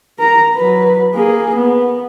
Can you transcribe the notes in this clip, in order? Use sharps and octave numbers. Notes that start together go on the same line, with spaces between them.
A#4 A#5
F#3 B4
A#3 G#4
B3